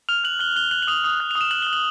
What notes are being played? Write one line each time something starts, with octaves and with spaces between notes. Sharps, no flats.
F6 F7
F#6 F#7
F#6 G7
F#6 G7
F#6 F#7
F#7
D#6 F7
D#6
F#6
D#6 F7
E7
F#6 F#7
F#6 G7
F#7